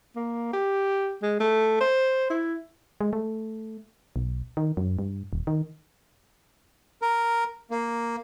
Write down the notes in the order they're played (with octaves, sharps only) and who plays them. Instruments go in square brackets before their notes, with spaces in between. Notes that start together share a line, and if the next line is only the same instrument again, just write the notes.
[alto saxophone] A#3
G4
G#3
A3
C5
E4
[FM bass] G#3
A3
B1
D#3
F#2
G2
D#1
D#3
[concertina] A#4
A#3